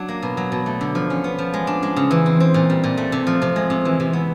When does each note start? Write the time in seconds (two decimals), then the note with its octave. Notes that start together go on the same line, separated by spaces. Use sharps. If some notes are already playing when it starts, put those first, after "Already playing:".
Already playing: F#3 D4
0.09 A#3
0.22 B2
0.37 F#3
0.52 B2
0.66 A3
0.81 D3
0.95 F3
1.10 C#4
1.24 B3
1.39 F3
1.54 G#3
1.67 D4
1.83 G#3
1.96 C#3
2.11 E3
2.26 C4
2.40 C4
2.54 A#2
2.70 G3
2.84 A#2
2.97 A3
3.12 C3
3.27 F3
3.42 C3
3.56 G#3
3.70 C3
3.85 E3
4.00 C3
4.13 B3